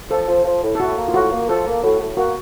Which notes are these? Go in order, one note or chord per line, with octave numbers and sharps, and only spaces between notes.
F3 A4
F3
F3
A2
A4
A2 F#4
A#3
F4
A2 F#4
A#3
F3 A4
A#3
A2 F#4
A2
A#3 F#4